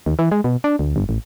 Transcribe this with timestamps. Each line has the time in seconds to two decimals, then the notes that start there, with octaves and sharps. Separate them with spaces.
0.06 D#2
0.19 E3
0.31 G#3
0.44 B2
0.64 D4
0.79 D2
0.96 G1
1.09 A1